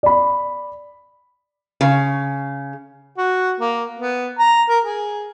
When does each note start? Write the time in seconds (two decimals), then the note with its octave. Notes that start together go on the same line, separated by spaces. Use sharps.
0.03 D5 B5
1.81 C#3
3.18 F#4
3.60 A#3
3.99 B3
4.39 A#5
4.69 A#4
4.84 G#4